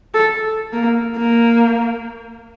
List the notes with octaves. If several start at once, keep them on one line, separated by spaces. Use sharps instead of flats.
A4
A#3
A#3